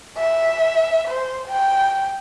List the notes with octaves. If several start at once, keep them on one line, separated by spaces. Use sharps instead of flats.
E5
C5
G5